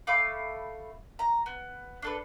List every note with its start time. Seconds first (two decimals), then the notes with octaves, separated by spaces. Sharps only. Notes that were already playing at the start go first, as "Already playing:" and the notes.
0.07 A3 F5 B5 D6
1.19 A#5
1.46 B3
2.02 D4 A4 B4